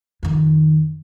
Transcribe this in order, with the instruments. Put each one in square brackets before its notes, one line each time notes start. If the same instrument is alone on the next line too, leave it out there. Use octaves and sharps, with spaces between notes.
[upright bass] F2 D#3